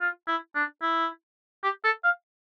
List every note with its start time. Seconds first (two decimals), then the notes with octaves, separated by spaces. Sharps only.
0.01 F4
0.28 E4
0.55 D4
0.82 E4
1.63 G4
1.84 A4
2.04 F5